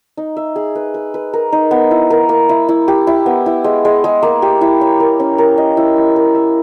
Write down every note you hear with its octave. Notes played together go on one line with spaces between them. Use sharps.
D#4
E5
G#4
B4
B4
B4
A#4
D#4
B3
E4
A#4
A#3
E4
E4
G4
E4
B3
E4
G#3
G#3
G#3
A#3
G4
E4
C#5
A#4
C#4
A#4
D#5
E4
E4
A#4
E5